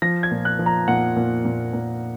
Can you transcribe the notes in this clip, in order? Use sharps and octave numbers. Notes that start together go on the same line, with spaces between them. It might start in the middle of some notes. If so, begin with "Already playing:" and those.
F3 A#6
G#6
A#2
F#6
F3
A#5
A#2 F#5
A#2
A#2
A#2